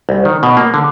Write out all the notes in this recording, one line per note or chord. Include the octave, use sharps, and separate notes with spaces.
C2
D#3
B2
A#3
D3